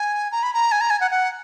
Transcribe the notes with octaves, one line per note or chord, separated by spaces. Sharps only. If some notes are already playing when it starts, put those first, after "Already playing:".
Already playing: G#5
A#5
B5
A#5
G#5
A#5
G#5
F#5
F#5